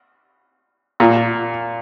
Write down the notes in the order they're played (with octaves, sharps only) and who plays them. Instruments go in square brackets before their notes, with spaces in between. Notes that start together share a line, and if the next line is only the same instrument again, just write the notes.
[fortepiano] A#2